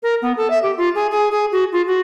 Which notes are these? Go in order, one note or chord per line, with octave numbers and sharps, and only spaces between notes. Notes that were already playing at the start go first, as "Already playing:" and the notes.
A#4
B3
A4
E5
G4
F4
G#4
G#4
G#4
F#4
F4
F#4